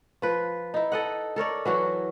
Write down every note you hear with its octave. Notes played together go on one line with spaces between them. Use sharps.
F3 B4
D#4 E4
A4 D#5 F#5
A4 A#4 C#5 D5
E3 F#3 F#4 C#5